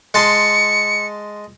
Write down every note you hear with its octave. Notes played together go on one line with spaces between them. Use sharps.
G#3 A5 C6 C#7